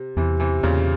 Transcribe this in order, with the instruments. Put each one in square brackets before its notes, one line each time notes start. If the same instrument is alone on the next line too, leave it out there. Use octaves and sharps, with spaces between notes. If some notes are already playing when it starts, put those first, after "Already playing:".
Already playing: [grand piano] C3
[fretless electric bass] E2 [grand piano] C3 E3
[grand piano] C3 E3
[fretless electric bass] E2 [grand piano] A#2 C#3